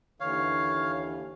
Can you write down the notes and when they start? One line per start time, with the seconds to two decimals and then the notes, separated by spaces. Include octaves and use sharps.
0.20 D#2 D3 E3 C#5 F5